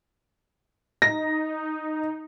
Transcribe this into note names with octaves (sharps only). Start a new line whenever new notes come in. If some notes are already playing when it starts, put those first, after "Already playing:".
D#4 A#6